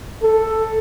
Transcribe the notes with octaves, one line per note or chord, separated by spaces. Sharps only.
A4